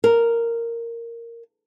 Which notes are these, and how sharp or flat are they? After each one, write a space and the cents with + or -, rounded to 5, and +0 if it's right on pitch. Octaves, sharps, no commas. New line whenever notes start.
A#4 -5